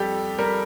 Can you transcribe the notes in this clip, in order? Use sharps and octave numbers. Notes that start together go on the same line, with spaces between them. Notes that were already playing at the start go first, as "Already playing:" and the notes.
Already playing: F2 G3 G4 A4
G3 A#4